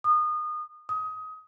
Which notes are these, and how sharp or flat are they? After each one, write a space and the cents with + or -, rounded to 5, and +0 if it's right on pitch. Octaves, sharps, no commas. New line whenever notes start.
D#6 -30
D#6 +20